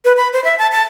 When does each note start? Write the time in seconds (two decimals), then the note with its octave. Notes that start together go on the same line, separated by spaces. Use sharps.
0.05 B4
0.17 B5
0.33 C5
0.44 E5
0.59 A5
0.72 A5